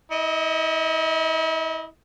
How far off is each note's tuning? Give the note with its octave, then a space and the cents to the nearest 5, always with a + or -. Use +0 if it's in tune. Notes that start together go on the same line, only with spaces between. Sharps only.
E4 -40 D#5 +0